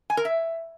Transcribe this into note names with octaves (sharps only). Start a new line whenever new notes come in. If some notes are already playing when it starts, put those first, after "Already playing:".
G#5
A#4
E5